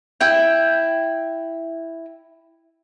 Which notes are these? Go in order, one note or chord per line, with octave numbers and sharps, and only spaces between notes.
E4 G5